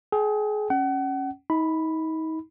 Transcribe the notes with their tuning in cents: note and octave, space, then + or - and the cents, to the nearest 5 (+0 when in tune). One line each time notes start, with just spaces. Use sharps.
G#4 +30 G5 +0
C#4 -10 F#5 +35
D#4 +35 B5 +0